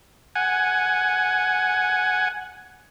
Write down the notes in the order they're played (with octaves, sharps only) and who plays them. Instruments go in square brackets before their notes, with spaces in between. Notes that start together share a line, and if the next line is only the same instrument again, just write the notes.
[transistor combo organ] F#5 G#5